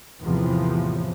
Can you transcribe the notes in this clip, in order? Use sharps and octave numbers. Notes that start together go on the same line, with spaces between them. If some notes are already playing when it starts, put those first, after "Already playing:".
E2 A2 C3 F3